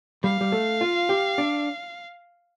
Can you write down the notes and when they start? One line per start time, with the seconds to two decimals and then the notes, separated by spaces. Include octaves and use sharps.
0.24 G3 F5
0.41 G3
0.52 A3
0.81 F4
1.09 G4
1.38 D4